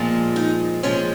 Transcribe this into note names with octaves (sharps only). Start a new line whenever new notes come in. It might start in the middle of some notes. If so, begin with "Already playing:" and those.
Already playing: A#2 F3 G#3
D#4
A#2 F3 G#3 C#4